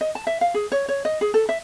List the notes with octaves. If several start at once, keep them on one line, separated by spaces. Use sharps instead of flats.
D#5
A5
E5
F5
G#4
C#5
C#5
D#5
G#4
A4
E5